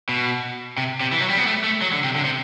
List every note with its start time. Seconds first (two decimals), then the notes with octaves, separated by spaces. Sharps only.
0.09 B2
0.78 C3
1.00 C3
1.12 E3
1.20 F#3
1.29 G3
1.38 B3
1.47 A3
1.64 A3
1.82 F#3
1.93 D3
2.04 C3
2.15 D3
2.24 C3